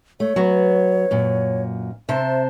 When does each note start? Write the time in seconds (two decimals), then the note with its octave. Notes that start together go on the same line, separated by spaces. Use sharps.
0.20 A3 C#5
0.36 F#3 B3
1.11 F#2 A#2
2.09 C3 C5 E5 A5